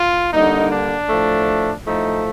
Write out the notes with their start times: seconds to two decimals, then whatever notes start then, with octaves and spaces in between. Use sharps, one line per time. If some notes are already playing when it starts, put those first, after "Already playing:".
Already playing: F4
0.33 D3 G3 A#3 D#4
0.71 D4
1.09 A2 F3 A3
1.86 A2 F3 A3 D#4